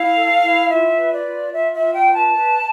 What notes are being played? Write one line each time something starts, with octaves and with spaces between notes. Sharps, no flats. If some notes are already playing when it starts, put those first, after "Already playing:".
Already playing: E4 F5
A4
E4
F4 E5
B4
D5
F4
F4 E5
E5
F4
G5
B4
A5
B4